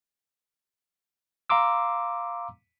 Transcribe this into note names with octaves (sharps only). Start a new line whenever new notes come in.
F5 A#5 C6 D6 E6